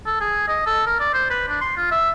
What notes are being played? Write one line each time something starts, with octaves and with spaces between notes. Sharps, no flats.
A4
G#4
D#5
A4
A#4
D5
C5
B4
D4
C6
F4
E5